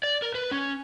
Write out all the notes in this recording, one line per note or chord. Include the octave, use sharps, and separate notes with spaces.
D5
A#4
B4
C#4